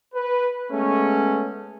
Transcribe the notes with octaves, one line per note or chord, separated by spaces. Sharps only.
B4
G#3 A3 B3 C#4